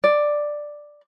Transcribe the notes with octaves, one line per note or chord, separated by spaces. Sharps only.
D5